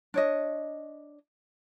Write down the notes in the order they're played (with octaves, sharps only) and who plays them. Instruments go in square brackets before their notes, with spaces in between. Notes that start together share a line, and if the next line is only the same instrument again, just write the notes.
[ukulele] D4 C#5 D#5